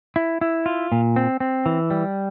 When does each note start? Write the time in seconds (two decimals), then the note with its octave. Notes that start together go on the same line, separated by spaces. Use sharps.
0.16 E4
0.41 E4
0.66 F4
0.92 A#2
1.16 C4
1.40 C4
1.66 E3
1.90 G3